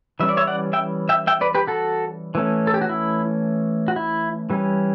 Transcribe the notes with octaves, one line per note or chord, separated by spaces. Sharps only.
E3 G3 C#4 E5
D5
C#5 E5
D5 F#5
E5 G5
E5 G5
E5 G5
B4 D5
G4 B4
F#4 A4
E3 A3 C#4
A4
G4
F#4
E4
F#4
E4
E3 G3 C#4